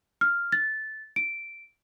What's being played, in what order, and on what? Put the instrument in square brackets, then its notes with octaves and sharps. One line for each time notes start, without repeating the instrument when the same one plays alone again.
[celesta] F6
A6
D7